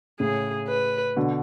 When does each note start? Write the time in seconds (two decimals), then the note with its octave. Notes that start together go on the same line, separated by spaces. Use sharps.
0.20 A2 C#3 G#4
0.68 B4
1.16 B2 D3